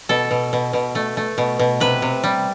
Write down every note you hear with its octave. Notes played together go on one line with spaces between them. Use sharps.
B2 A4
B2
B2
B2
A3
A3
B2
B2
C3 B4
C3
G3